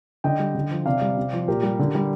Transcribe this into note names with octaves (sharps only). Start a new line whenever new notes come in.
D3 D#5 G5
G3
D3
F3
C3 D5 F5
G3
C3
F3
A#2 G4 A#4
G3
D3
G3